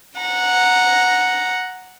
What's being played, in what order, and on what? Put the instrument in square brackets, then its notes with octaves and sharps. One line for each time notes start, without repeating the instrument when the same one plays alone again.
[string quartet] F#5 A#5